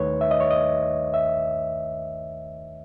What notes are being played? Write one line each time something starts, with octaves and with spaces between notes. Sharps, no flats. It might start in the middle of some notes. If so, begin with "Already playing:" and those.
Already playing: D#2 D#3 A3 D#4 B4 C#5
E5
D#5
C#5
D#5
E5